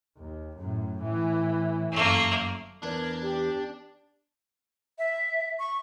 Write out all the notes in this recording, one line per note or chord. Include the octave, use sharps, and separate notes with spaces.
D#2
F#2 A2
A2 E3
G1 F#2 A3 A#3
E2 D4 A#4 G#6
G4
E5
C#6